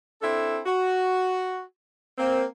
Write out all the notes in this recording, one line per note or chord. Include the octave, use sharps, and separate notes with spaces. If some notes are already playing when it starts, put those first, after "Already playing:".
C4 D4 E4 A4
F#4
A#3 C4